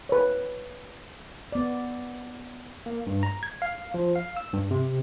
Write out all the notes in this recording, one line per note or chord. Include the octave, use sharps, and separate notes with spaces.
B4 C#5
B3 D5
A#3
G2
A#5
G#6
F5
F3
F5
E6
G2
C3